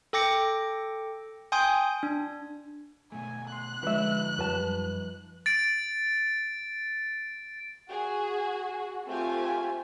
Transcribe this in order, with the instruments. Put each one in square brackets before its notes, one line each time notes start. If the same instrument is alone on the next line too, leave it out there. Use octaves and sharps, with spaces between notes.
[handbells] A4 G5 D6 A#6 C#7
G5 G#5 C6 D#6 G6
D4
[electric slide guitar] B2 A3 [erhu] G#5
[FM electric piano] C6 [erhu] F#6
[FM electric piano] D3 G#3 [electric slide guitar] F3 D#4 [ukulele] B4 E5
[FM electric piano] F#2 G3 [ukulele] B4 A5
[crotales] A6 D7
[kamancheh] F#4 [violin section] G#4
[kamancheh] A3 F4 [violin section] C4 G4 G#5